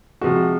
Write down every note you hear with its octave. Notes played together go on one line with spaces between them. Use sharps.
C3 F3 G#3 F#4